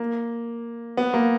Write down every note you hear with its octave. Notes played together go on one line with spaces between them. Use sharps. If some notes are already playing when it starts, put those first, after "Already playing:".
Already playing: A#3
B3
A#3